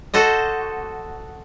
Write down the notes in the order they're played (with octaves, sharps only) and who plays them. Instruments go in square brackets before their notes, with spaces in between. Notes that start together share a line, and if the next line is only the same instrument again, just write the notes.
[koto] F#4 A4 C5 D#5